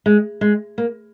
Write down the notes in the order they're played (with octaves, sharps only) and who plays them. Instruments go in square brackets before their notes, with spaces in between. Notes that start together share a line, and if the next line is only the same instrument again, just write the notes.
[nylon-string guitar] G#3
G#3
A#3